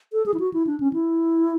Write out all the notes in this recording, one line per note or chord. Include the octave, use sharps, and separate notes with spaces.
A4
G#4
E4
F#4
E4
D4
C#4
E4